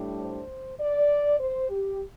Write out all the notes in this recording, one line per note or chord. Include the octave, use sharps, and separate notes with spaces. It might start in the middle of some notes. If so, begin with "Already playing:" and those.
Already playing: A2 G3 D4
C5
D5
C5
G4